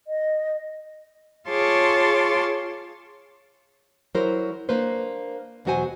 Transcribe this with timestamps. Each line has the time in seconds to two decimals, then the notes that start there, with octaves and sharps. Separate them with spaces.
0.07 D#5
1.48 F4 G#4 C#5 A5 C6 D6
4.15 F#3 E4 A#4 C5
4.69 A#3 D4 B4 C5
5.65 E2 B2 F#3 F#4 C5 G#5